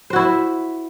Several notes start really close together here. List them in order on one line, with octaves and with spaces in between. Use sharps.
C5 F#4 E4 E5